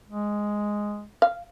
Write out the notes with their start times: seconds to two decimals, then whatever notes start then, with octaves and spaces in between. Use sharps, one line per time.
0.08 G#3
1.22 F5